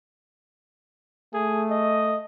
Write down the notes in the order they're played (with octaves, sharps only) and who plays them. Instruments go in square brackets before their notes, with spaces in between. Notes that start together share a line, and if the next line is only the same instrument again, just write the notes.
[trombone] A3 [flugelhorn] G#4
[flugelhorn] D#5